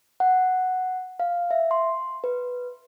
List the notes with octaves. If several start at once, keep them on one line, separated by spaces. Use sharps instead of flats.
F#5
F5
E5
C6
B4